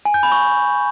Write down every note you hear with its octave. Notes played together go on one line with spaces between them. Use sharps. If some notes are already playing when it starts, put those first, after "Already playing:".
G#5
G6
B5
C#6